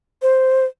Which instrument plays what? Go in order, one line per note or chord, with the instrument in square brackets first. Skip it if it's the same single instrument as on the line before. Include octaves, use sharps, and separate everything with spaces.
[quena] C5